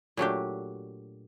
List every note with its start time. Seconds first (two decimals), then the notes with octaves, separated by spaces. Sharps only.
0.17 A#2 F#3 A3 D4 G4